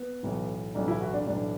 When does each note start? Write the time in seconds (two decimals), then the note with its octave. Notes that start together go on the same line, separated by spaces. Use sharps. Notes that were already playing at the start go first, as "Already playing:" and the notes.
Already playing: B3
0.23 B1 A2 E3
0.75 B1 A2 E3 D4
0.88 E4
1.01 F#4
1.13 D4
1.27 B1 A2 E3 D4